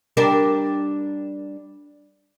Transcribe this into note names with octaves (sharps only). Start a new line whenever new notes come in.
G3 D4 A#4